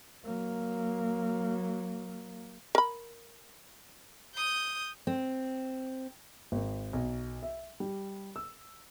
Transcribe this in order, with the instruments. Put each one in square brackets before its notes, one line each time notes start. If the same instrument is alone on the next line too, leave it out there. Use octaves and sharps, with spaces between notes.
[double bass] F#3 A#3
[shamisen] A#4 B5
[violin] D#6 G6
[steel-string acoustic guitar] C4
[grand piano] G#1
B1
E5
G3
E6